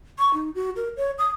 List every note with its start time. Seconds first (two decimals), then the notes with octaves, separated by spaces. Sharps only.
0.19 C#6
0.34 D#4
0.55 F#4
0.76 A#4
0.97 C#5
1.18 D#6